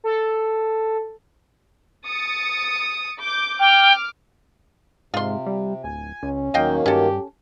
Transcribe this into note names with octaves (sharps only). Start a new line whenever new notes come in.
A4
D#6 A6 C#7
D6 G6
G5 D6 F6
G#2 C3 F4 C6
G3
D1 G#5
C#2 C#4
D#1 D#3 F#3 A#3 D#5 F5 G5
G2 C#4 G4 A4